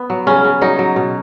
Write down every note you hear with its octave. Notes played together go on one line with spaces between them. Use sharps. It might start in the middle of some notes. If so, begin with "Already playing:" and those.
Already playing: B3
F#3
C#3 C#4
C#3
F#3 D#4
F#3
B2